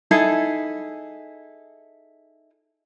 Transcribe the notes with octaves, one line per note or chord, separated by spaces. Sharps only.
D#4 E4 G#4 A4